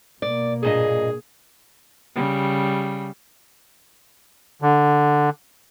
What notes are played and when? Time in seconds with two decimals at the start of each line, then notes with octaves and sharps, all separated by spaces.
0.22 B2 A#3 D5
0.63 G2 A#2 G#4 D#5
2.16 C#3 G3
4.62 D3